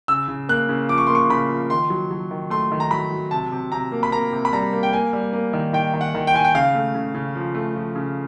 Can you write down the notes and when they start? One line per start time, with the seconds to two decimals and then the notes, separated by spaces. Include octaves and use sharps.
0.08 C#3 E6
0.28 C#3
0.49 A#3 F#6
0.69 C#3
0.89 F3 D6
0.98 C#6
1.07 A#3 C6
1.15 C#6
1.29 C#3 B5
1.49 F3
1.70 D#3 C6
1.90 F#3
2.11 F#3
2.31 D#3
2.50 A3 C6
2.72 D#3
2.80 A#5
2.91 F#3 B5
3.11 F#3
3.31 C3 A5
3.52 C3
3.72 C3 A#5
3.92 A#3
4.03 B5
4.12 A#3 A#5
4.33 C3
4.45 B5
4.53 G3 A#5
4.73 A#3
4.83 G5
4.93 A#3 G#5
5.13 G3
5.33 A#3
5.53 D#3
5.73 D#3 G5
5.94 D#3
6.01 F#5
6.15 D#3
6.27 G5
6.34 D#3 G#5
6.45 G5
6.55 C#3 F5
6.75 A3
6.95 C#3
7.15 C#3
7.35 F3
7.55 A3
7.76 F3
7.96 C#3